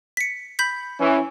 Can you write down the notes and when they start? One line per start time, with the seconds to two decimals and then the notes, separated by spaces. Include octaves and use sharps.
0.17 B6 C#7
0.59 B5 G6 B6
1.00 E3 C#4